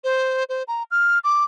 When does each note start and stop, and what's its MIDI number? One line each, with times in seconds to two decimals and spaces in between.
0.04 0.44 72
0.49 0.63 72
0.68 0.83 82
0.91 1.19 89
1.24 1.44 86